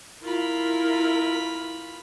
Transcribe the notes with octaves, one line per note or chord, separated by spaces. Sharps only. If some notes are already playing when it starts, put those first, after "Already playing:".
E4 F4 A#4 B5